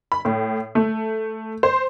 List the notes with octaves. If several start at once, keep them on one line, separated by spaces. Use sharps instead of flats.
B5
A2
A3
C5